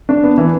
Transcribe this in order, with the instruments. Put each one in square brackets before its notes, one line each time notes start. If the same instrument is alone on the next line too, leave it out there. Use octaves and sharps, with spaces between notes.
[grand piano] D4
B3
E3